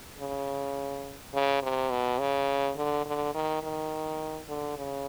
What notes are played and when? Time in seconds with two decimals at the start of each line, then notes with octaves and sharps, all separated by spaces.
0.19 C#3
1.34 C#3
1.63 C3
1.91 B2
2.20 C#3
2.77 D3
3.05 D3
3.34 D#3
3.63 D#3
4.48 D3
4.77 C#3